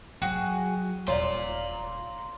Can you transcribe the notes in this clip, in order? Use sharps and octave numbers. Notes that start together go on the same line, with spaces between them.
F#3 F#4 G#4 G5
D#1 F4 C#5 D5 A#5 C6